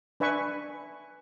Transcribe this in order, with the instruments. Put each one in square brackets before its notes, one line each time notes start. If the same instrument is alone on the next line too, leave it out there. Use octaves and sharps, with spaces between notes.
[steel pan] D4 B4 E5 G#5 C#6